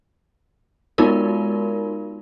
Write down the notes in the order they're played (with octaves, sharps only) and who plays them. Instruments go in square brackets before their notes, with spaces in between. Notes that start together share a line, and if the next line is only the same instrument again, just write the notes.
[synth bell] G#3 B3 D#4 F4 F#4 A#4